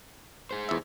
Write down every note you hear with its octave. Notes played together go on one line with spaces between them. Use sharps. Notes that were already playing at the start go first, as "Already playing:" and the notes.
G#4 C5
E2 E5